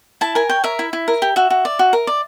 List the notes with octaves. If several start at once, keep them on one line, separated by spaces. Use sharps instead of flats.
E4 A5
A#4 G#5
C#5 G5
A#4 E5
E4
E4
A#4
G4
F#4 E5
F#4
D5
F#4
A#4
D5